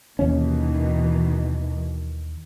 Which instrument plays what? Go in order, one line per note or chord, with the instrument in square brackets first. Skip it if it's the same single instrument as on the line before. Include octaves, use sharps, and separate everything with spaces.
[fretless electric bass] D#2 C#4 [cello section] B2 D#3 E3